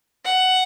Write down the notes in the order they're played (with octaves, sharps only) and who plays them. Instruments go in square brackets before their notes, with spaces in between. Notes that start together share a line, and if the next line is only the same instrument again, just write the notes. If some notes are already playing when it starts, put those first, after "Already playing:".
[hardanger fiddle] F#5